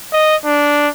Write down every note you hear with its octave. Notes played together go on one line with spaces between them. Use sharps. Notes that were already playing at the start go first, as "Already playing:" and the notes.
D#5
D4